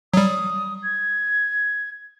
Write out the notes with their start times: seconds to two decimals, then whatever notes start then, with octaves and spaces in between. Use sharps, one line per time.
0.14 F#3 G3 D#6
0.84 G#6